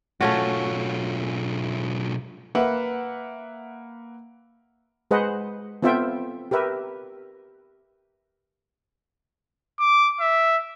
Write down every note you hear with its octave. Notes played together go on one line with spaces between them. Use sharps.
B1 A3 C#4 F4 F#4
A#3 B4 E5 F#5
G#3 G#4 B4 C5 D#5 F#5
B3 C4 F4 A4 E5 G5
G4 A#4 B4 E5
D6
E5